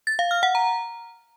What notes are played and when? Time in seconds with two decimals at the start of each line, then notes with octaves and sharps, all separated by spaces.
0.07 A6
0.19 F5
0.31 F6
0.43 F#5
0.55 A#5